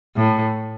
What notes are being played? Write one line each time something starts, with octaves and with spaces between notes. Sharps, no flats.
A2